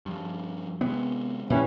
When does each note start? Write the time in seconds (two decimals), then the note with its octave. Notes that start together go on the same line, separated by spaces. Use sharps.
0.06 G2 F3
0.81 C3 G#3 B3
1.50 G2 A#2 E3 C#4